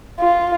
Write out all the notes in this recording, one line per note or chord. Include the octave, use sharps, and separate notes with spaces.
F4